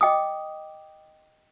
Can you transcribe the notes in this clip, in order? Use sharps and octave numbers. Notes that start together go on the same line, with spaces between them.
D#5 G5 D6 D#6